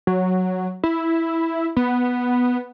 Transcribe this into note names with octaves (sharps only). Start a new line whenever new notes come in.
F#3
E4
B3